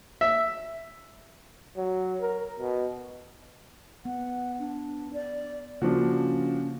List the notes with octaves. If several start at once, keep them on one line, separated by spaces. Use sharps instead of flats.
E5
F#3
A#4
B2
B3 F#5
D4
D5
C#3 F3 A#3 C#4 D4 F4 F#4